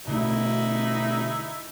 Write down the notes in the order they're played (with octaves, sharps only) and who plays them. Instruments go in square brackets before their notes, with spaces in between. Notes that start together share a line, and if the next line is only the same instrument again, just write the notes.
[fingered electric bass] B2 D3 A3 [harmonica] D#4 E4